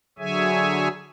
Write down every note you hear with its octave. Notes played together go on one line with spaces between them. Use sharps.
D3 F#3 G#4 C#5 E5 G#5